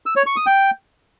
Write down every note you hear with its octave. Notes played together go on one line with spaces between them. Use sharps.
E6
C#5
C#6
D#6
G5